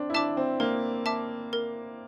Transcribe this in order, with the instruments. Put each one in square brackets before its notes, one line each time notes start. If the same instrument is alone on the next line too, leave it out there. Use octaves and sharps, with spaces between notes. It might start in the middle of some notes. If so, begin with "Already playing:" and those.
Already playing: [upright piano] C4 D4
E4
[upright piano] D4 [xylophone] E5 A5 D6
[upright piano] C4
[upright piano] A#3 [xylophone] A#4
[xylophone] E5 A5 D6
A#4